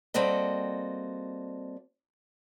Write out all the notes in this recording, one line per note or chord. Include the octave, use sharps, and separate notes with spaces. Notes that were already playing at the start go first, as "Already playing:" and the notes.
G3 A#3 C4 F#4 A4 D#5